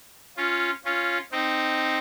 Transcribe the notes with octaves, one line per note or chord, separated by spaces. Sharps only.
C#4 F4
C#4 F4
C4 D#4